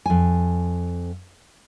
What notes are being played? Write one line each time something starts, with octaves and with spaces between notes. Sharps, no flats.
F2 G#5